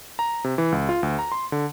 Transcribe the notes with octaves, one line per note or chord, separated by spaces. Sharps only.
A#5
C3
E3
C#2
F4
D2
A#5
C6
D3